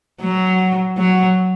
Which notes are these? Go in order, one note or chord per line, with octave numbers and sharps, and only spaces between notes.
F#3
F#3